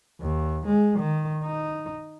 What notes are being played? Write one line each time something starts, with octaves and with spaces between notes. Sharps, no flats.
D#2
G#3
D#3
D#4